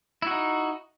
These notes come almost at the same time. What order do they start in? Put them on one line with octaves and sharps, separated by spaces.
E4 F#4 D#4